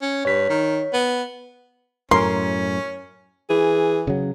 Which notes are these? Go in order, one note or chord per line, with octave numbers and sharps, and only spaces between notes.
C#4
G2 C#5 B6
D#3
B3
F#2 A2 C#4 A#4 C6
E3 G#4
C#3 F#3